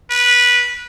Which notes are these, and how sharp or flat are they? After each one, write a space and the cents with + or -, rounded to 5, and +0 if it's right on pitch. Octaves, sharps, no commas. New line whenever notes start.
B4 -15